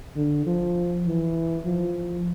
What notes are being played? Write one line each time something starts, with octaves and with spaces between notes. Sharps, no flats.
D3
F3
E3
F3